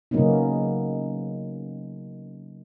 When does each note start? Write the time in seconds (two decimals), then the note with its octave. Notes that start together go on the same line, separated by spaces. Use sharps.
0.11 C#3 F#3 A#3 B3 C#4 D#4